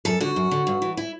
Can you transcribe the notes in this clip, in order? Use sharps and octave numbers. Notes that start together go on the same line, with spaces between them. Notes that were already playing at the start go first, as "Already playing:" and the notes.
F#2 A4
D3 F#4
F#2
D3
G2
E3
E4